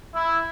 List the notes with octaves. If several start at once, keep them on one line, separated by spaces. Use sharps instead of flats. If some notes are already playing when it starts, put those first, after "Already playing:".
E4